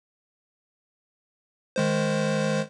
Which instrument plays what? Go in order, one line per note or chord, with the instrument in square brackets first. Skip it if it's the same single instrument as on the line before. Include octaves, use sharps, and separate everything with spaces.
[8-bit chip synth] D#3 G#3 C5